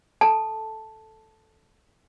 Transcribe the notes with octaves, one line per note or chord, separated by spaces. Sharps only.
A4 A5